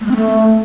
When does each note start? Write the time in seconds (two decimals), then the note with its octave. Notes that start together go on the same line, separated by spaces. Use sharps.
0.01 A3
0.06 G#3
0.11 C4
0.16 A3